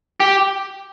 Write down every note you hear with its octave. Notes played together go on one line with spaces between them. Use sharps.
G4